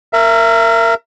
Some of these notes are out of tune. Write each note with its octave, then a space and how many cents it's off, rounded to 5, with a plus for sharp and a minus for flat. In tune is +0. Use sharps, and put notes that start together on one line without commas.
A#4 -15 E5 +30